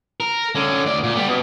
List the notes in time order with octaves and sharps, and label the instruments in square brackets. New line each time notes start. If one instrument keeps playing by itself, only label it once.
[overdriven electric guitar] A#4
D3 C#4
D2 D5
A#2
G3 B3
B2